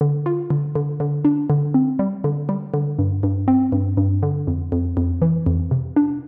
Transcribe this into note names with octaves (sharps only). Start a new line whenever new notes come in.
D3
F4
D3
D3
D3
D4
D3
C4
G3
D3
G3
D3
G2
G2
C4
G2
G2
D3
F2
F2
F2
E3
F2
C3
D4